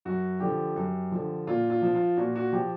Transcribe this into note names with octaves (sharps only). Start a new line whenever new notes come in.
F#2 F#4
D3 F3 G4
F#2
D3 F3
A#2 F4
F4
F3
F4
A#2 F#4
F#4
F3 G4